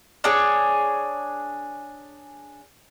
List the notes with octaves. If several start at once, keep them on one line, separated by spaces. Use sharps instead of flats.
D4 G#4 C#5